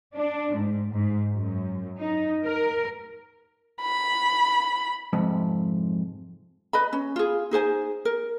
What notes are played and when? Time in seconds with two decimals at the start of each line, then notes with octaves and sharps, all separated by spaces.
0.14 D4
0.55 G#2
0.92 G#2
1.34 F#2
2.00 D#4
2.44 A#4
3.82 B5
5.13 F2 G#2 C3
6.73 B4 D#5 B5
6.93 C#4
7.16 F4 G#4
7.51 D#4 G#4 C5 G#5
8.05 A#4